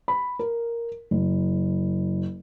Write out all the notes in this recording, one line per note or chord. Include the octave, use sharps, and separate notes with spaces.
B5
A#4
F#1